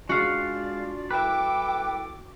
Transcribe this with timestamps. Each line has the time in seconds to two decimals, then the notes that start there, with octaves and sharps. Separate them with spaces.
0.09 G#3 D4 F4 F#4 D5 F5
1.11 C2 A4 B4 E5 G5 D6